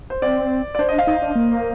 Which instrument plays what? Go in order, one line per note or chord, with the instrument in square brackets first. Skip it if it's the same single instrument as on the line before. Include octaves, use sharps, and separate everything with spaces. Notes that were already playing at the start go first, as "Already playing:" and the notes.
[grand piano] C5
[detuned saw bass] C4 [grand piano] D5
[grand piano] D5
[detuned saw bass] D4 [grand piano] C5
[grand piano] D#5
F5
[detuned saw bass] D#4 [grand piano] D#5
[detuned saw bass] D4
A#3